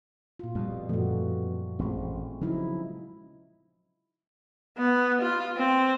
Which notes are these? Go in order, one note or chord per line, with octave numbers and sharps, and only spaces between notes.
A#2 F4
F2 B2 G3
F#2 A#2 F3 A3 F#4
A1 G#3 C4
C#3 F3 F#3 D#4 E4
B3
F4
C4